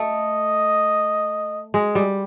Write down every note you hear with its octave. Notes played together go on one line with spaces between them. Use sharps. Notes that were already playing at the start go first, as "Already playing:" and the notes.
Already playing: A3 D#5
G#3
G3